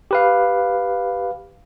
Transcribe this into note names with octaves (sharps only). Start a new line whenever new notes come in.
G4 B4 F5